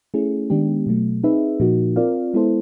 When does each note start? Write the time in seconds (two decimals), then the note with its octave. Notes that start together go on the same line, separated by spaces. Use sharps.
0.14 A3 C#4 E4 G#4
0.50 D#3 G#3 B3 D4 G4
0.87 B2 F#3 A3
1.24 C4 D#4 G#4 B4 E5
1.60 A#2 F3 A#3 D#4 F#4
1.96 C4 F4 A#4 D5 F5
2.34 G#3 B3 E4 A4 C5